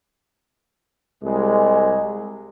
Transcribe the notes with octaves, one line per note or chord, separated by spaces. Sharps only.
C2 G#3